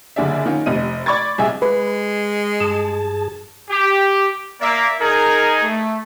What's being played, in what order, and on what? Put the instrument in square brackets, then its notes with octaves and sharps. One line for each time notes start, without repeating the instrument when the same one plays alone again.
[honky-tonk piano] F#1 D3 G#4 D5 E5
D#3 C#4 F4
F1 C3 D#5 D#7
D5 B5 C#6 D6 G#6 A6
C2 G#4 D#5 E5 G#5
[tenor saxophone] G#3 [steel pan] B4
[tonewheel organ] G2 G#4 A5
[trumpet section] G4
[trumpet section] A#3 [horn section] D5 E5
[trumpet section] D#4 G#4 [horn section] A#4
[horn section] A3